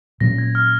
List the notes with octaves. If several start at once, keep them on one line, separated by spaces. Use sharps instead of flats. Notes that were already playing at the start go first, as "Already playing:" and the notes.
A#2 F#3 C#4 A#6
G#6
F6